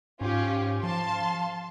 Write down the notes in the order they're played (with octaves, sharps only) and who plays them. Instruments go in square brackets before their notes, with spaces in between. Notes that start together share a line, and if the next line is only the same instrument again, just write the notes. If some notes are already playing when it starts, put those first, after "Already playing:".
[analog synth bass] G#2 [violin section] C#4 F4 G4
[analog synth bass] F3 [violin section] F5 A5 C6